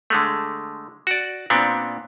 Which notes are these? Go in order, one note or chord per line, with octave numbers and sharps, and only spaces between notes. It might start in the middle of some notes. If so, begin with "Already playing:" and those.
D3 G#3 A3
F#4 D5
A#2 B3 C4 D4